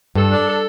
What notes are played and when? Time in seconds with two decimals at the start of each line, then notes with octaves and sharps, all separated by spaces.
0.15 G2 A4
0.31 D4
0.47 A4